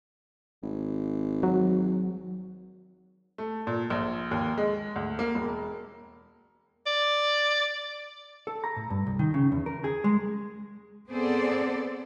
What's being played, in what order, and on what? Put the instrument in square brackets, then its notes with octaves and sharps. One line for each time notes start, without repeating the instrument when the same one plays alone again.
[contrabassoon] G#1
[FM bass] F#3
[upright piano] A3
A#2
A#1
D#2
G#3
D2
A#3
E1
[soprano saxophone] D5
[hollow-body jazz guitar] A4
A#5
A2
G2
C2
D#3
C#3
E2
A#4
G#4
G#3
[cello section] B3 C4 G#4 A4 C5 D5